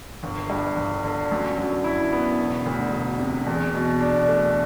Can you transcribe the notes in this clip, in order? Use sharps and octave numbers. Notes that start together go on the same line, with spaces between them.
G1
G2
G1
D3
F#2
F#3
E4
B3
E1
D2
E1
C3
E2
B2
D4
A3